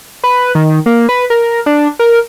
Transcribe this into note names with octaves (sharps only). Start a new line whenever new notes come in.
B4
D#3
A#3
B4
A#4
D4
A#4